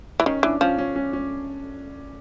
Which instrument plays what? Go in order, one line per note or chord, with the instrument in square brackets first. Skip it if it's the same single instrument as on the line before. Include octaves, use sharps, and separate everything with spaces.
[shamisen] E3
[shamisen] D#3 [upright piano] C#4
[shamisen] E3 [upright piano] D4
[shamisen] F3 [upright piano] C#4
[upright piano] C#4
C#4
C#4